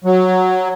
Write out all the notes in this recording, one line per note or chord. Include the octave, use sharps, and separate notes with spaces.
F#3